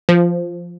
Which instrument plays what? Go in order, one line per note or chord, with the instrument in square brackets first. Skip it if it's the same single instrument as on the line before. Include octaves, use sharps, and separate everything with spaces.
[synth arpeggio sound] F3